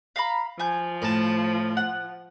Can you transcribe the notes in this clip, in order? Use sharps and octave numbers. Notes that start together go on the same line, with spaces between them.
F5 A#5 B5
F3 G#5 G6
A2 A5
F#5